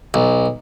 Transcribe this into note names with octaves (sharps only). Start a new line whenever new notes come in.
B1